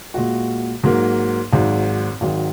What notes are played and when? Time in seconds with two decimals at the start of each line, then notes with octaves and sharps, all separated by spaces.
0.14 A#2 G#3 F#4
0.83 G#2 F#3 A#3
1.53 G#1 G#2 F#3
2.21 G#1 G#2 D#3 F#3